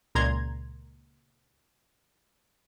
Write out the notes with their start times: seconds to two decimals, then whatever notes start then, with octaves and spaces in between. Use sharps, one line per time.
0.15 C#2 A#2 A#5 C6 G#6